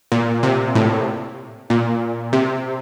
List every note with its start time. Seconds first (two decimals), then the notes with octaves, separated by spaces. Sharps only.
0.12 A#2
0.43 C3
0.75 A2
1.70 A#2
2.33 C3